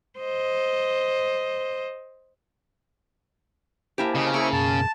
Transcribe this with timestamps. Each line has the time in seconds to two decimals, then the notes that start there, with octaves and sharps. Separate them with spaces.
0.19 C5 D#5
3.98 A#3 E4 G4 C5 G#5 A5
4.15 C#3 D#5
4.34 A#3 E4 G#4 C#6
4.53 F#2 B2 A5